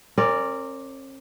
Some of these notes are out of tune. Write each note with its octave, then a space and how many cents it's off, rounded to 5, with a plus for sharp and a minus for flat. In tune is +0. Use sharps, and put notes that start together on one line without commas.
C#4 -45 A#4 -20 D5 +0